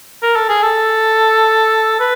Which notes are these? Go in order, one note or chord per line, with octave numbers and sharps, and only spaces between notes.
A#4
A4
G#4
A4
B4